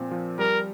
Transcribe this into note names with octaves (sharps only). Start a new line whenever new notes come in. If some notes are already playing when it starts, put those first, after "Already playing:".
Already playing: A#2 F3 C4
F3
G3 A#4